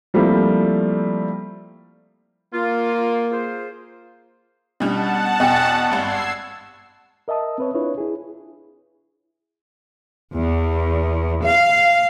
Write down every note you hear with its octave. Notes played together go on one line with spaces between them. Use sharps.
F3 G3 A3 A#3 C4 E4
A#3 F4
F4 G#4 C5
B2 G3 C#4 D4 F#5 A5
E2 B2 D#5 G5 G#5
G#1 G2 E6 G#6 C7
A#4 D#5 E5 A5 D#6
C4 B4 C#5
D4 E4 F4 B4 C#5
E4 G#4
E2
F5